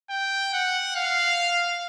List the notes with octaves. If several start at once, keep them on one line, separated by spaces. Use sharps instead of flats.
G5
F#5
F5